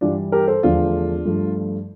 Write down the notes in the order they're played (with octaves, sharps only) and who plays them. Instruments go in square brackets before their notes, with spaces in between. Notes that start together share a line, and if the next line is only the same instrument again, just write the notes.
[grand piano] G2 E3 G3 D4 F4
G4 A#4
A4 C5
E2 D3 F3 A3 D4 F4
G2 F3 A3